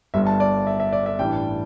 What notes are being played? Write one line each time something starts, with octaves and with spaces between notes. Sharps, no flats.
G1 G2 G3 E5
A5
D5
E5
E5
D5
E5
A1 G2 E3 G3 D4 G5